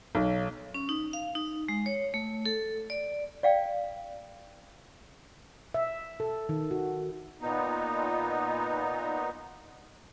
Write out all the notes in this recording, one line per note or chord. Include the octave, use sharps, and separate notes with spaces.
B1
C#4
D#4
F5
D#4
G#3
C#5
A3
A4
D5
D5 F5 G5
E5
A4
D#3
F#4
A#2 B3 D#4